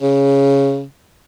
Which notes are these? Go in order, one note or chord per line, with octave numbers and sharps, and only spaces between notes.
C#3